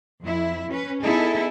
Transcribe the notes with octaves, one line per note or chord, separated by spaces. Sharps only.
F2 E4
C#4 B4
B3 D#4 E4 G#4 A4